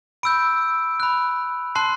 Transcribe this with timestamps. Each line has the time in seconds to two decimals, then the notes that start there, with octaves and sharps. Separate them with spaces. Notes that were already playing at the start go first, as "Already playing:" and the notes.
0.23 B5 E6 G6 D7
1.00 B5 F#6
1.75 A5 C6 F#6 C7